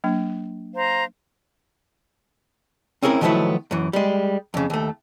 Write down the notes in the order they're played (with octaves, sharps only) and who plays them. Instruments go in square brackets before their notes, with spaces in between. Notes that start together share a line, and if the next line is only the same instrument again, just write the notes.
[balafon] F#3 A#3 D4
[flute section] C5 F5 A#5
[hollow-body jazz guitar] C4 C#4 E4 G#4 A#4
D#3 F3 F#3 A3 B3 E4
F#2 E3
G3 G#3
F2 C#3
D#2 A3